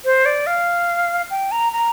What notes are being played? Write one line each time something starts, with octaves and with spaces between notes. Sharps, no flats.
C5
D5
F5
G5
A#5
A#5